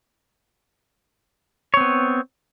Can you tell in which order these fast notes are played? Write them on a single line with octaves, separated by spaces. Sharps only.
C#5 C4 B3